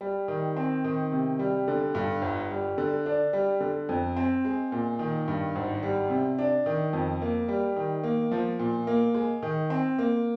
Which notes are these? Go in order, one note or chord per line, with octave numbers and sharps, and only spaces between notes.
G3
D#3
C4
D#3
C3
G3
D3
G2
G1
G3
D3
D4
G3
D3
F2
C4
G#3
A#2
D#3
G2
G#1
G3
C3
D4
D#3
F2
A#3
G3
D#3
A#3
F3
A#2
A#3
G#3
D#3
C4
A#3